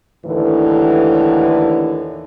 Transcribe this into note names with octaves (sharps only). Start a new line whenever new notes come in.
D#2 A2 D3 E3